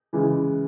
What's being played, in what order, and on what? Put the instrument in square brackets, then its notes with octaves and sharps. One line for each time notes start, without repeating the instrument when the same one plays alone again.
[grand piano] C#3 E3 G#3